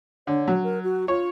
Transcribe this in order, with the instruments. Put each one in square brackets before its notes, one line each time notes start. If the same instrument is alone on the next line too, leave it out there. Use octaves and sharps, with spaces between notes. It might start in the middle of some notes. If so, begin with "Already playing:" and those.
[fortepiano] D3 [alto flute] C#5
[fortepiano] F#3
[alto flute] A#4
F#4
[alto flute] F4 [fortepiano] C#5